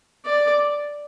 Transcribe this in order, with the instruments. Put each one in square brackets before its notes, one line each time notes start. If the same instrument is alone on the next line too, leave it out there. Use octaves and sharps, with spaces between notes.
[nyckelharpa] D5